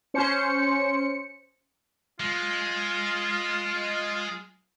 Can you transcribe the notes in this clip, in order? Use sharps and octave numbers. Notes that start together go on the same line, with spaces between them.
C#4 C5 C#7
G#3 F4